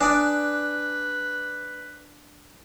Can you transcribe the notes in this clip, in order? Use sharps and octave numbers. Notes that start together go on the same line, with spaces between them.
D4 B4 D5 G#5 D#6